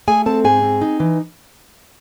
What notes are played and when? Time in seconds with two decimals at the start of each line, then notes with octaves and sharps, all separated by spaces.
0.08 A3 G#4 G#5
0.26 C4 A4 A5
0.44 G#2 G#4 G#5
0.63 C4
0.81 D#4
1.00 E3